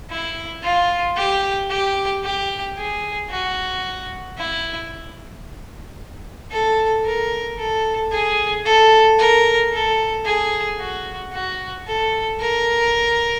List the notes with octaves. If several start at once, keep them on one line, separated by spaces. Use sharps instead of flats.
E4
F4
G4
G4
G4
G#4
F#4
E4
A4
A#4
A4
G#4
A4
A#4
A4
G#4
F#4
F#4
A4
A#4